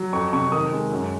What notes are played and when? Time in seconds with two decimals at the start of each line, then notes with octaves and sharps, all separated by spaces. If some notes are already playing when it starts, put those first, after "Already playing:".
Already playing: F#3
0.13 F2 C#6
0.33 C3 C#6
0.52 D#3 D#6
0.71 G#3
0.91 F#2